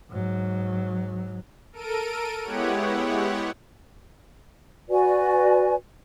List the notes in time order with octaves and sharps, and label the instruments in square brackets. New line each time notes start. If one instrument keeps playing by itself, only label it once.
[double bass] G#2 F#3
[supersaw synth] A4 A#4 D7 D#7
G#3 B3 E4 G4 C#5 F#5
[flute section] F#4 B4 D5 G#5